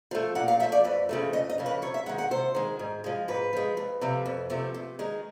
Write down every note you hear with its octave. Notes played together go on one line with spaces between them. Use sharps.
F3 A3
A#2 F#5
F5
F3 A3 E5
D5
F2 B4
C#3 F3 A3
F2 D#5
D#5
C#3 F3 A3
B4
C3 C#5
E5
D#3 G#3 F#5
F#5
C3 C5
D#3 G#3
G#2
F3 G#3
G#2 B4
F3 G#3
F2
C3 F3 A3
F2
C3 F3 A3
C3
D#3 G#3